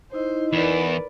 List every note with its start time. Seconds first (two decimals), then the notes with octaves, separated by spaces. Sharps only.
0.13 D#4 E4 C5 D#5
0.53 E2 A#4 B4 D5